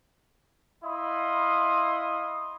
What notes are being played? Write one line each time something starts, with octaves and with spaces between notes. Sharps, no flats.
E4 D#5 F5 B5 C6 D#6